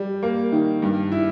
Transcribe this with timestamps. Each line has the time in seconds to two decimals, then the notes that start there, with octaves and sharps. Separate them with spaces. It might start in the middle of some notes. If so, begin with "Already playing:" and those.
Already playing: G3
0.23 A#3
0.52 D#3
0.82 G2
1.12 E4